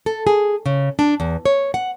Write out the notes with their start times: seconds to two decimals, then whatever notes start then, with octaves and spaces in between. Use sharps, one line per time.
0.06 A4
0.27 G#4
0.66 C#3
0.99 D4
1.20 E2
1.45 C#5
1.74 F#5